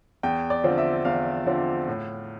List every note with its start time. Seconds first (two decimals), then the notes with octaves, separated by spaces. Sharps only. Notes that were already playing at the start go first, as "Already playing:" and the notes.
0.23 E2 G5
0.50 D5
0.64 D3 F3 C4 F4
0.78 E5
1.05 E2 F5
1.46 D3 F3 C4 F4
1.88 A2